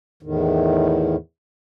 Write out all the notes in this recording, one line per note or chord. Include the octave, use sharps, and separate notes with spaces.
E2 A2 D#3